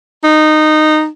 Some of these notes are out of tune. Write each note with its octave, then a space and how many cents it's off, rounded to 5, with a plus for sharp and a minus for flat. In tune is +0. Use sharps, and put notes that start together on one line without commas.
D#4 -15